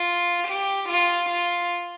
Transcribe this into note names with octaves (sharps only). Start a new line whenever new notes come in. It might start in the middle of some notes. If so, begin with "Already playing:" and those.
Already playing: F4
G4
F4
F4